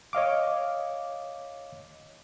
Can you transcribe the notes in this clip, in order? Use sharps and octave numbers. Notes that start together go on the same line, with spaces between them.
C#5 D#5 F5 D6